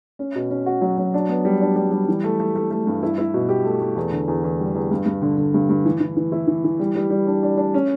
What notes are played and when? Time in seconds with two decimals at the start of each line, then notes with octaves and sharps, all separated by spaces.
0.19 C#4
0.35 B2
0.51 C#4
0.66 F#4
0.82 F#3
0.98 F#3
1.14 D4
1.29 B3
1.45 G3
1.61 D4
1.76 G3
1.91 G3
2.08 E3
2.24 A3
2.40 A3
2.56 A3
2.71 A3
2.87 G2
3.03 E4
3.18 E4
3.34 B2
3.49 G4
3.65 A3
3.81 A3
3.96 E2
4.12 D3
4.28 E2
4.44 E2
4.59 G3
4.75 E2
4.91 G2
5.06 G2
5.22 D3
5.38 D3
5.54 G2
5.69 G2
5.85 E3
6.00 E3
6.17 E3
6.32 E4
6.47 E3
6.64 E3
6.79 G3
6.95 G3
7.10 G3
7.27 D4
7.43 D4
7.57 D4
7.74 C#4